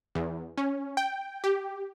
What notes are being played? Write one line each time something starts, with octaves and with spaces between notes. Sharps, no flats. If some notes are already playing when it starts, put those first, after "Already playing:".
E2
C#4
G5
G4